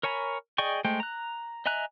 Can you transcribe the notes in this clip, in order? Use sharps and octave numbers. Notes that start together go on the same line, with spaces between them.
A#4 C#5 G#5 A#5 B5
G#4 D5 D#5 G5 C#6
G#3 A3 C5 G5
A#5 F#6
D#5 E5 G#5 A#5 F#6